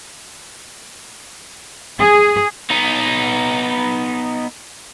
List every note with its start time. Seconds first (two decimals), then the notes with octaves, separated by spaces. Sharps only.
1.99 G#4
2.71 B3 D#4